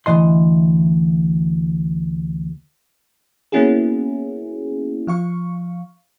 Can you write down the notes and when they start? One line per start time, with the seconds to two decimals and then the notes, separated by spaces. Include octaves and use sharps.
0.06 D2 G#2 E3 D#5 C6
3.52 A#3 B3 C#4 E4 F#4 G#4
5.07 F3 F5 C#6